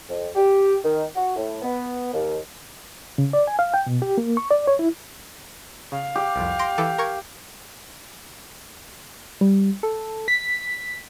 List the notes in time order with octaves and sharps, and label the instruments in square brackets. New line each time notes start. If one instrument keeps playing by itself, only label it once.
[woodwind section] F2
G4
D#3
F#4
A2
B3
D#2
[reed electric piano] C#3
D5
G#5
F5
G5
B2
G4
A#3
C#6
D5
C#5
E4
[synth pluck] C#3 [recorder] F5
[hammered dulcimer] G4
[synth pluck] C2 F2
C6 A#6 D7
E3 A4 D6
A#4 C#6 G#6
[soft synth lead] G3
A4
B6